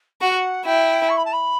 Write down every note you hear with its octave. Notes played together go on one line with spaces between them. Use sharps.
F#4 F#5
E4 G5
C#6
B5
A5
B5